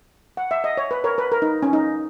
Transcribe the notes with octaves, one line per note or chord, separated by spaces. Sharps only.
F#5
E5
D#5
C#5
B4
A#4 C#5
B4
A#4
D#4
C#4
D#4